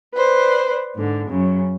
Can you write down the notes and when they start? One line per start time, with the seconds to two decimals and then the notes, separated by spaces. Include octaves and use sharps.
0.14 B4 C5 D5
0.94 G#2 D3
1.29 F#2 C#3